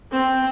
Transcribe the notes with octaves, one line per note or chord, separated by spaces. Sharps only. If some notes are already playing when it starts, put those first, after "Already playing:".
C4